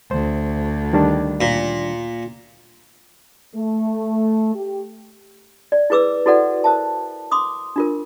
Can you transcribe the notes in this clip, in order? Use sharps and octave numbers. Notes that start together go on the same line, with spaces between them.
D2 C5
D#3 G3 D4
A#2
A3
G4
D5
E4 G#4 B4 D6 E6
E4 F#4 A4 B4 D5 F#5
A#4 C5 E5 A5
C6 D6 D#6
D4 F4 A#4